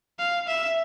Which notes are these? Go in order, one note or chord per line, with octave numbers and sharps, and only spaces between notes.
F5
E5